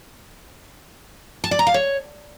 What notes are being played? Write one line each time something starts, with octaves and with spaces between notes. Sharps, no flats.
A5
D5
A#5
F5
C#5